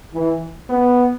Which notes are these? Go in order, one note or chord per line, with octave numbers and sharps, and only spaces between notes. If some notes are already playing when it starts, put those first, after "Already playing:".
E3
B3